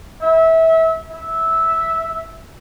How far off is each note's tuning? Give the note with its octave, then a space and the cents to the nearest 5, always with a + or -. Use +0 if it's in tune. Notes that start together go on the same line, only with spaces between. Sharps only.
E5 -25
E5 -10